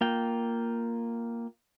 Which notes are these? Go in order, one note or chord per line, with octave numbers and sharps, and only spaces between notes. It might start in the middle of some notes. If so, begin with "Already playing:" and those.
A#3 F4 G5